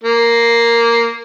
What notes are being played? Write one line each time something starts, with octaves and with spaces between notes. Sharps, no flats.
A#3